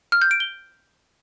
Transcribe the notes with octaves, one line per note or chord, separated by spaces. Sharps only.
F6
G6
D7
G7